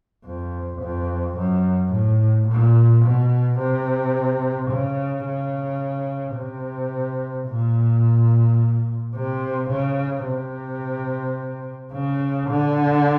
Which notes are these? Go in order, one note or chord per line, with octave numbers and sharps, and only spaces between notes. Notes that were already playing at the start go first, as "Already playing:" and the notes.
F2
F2
F#2
A2
A#2
B2
C3
C#3
C#3
C3
A#2
C3
C#3
C3
C#3
D3